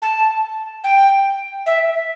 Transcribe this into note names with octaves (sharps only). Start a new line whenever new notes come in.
A5
G5
E5